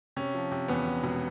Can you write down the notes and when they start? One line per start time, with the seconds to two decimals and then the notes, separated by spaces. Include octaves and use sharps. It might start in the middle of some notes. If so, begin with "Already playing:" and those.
0.16 C3 C#4
0.34 F3
0.52 C3
0.68 E2 B3
0.86 C3
1.04 E1